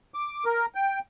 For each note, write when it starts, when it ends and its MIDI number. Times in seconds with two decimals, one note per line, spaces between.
0.14 0.44 86
0.45 0.66 70
0.75 0.99 79